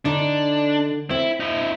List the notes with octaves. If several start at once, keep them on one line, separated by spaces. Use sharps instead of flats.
D3 D4 D#4
C4 E4
D#4 E4